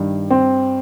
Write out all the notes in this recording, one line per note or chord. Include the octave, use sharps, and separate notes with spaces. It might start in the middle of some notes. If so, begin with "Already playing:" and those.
Already playing: G2 D#3
C4